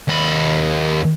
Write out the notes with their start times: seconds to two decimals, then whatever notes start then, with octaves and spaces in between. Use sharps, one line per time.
0.08 D#2 B5